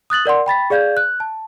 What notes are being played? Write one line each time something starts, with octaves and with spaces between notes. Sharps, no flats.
D#6 F#6 A6 F#7
A#4 D5 F#5 C6
G5 B5 A6 B6
G#4 D5 F5 G6 G#6
F#6
A5